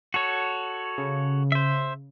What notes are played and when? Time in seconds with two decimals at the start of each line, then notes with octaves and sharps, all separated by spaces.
0.14 F#4 A4 C#5
0.98 C#3
1.52 C5 E5